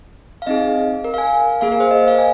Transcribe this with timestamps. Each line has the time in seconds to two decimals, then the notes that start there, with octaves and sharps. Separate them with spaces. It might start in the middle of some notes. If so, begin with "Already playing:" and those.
0.42 F5
0.46 C4 D#4 G#4 D#5
1.04 A#4
1.14 F5
1.18 G#5
1.61 A#3 G#4 F5
1.72 A#4
1.80 C5
1.91 D#5
2.08 F5
2.18 G#5